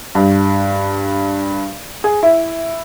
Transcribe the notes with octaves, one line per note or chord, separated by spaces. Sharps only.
G2
G#4
E4